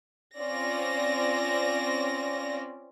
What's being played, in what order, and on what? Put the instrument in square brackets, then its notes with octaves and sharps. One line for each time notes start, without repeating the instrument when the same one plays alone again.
[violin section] C4 C#4 F4 D5 A#6